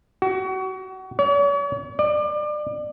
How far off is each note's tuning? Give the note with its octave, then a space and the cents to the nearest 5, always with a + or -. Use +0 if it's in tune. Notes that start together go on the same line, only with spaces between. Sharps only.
F#4 +30
C#5 +45
D5 +30